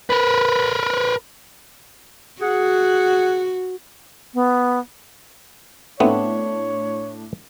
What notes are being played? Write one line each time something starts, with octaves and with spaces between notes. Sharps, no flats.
A#4 B4
F#4 G#4 F#5
B3
A2 A3 B3 C4 D4 C#5